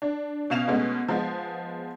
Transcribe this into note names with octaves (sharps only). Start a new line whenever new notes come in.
D4
B2 C#4 F5 E7 F7
B2 G#3 A3 B3 C#4
F3 G#3 B3